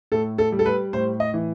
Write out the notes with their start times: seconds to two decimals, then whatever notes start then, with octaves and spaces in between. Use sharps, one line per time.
0.12 A2 A4
0.38 A4
0.52 G3
0.59 A4
0.66 B4
0.93 A2 C5
1.20 D#5
1.34 E3